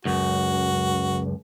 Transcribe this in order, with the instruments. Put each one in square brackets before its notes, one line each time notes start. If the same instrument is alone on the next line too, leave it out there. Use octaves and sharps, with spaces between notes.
[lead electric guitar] C#2 F#2 [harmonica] F#4